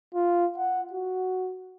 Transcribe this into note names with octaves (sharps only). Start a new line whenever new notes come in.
F4
F#5
F#4